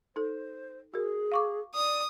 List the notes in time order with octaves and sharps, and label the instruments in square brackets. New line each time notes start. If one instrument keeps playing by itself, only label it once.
[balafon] D#4 A4 [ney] C5
[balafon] F#4 A#4 [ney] G#4
[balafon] F5 C#6 D6
[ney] D5 [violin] D#6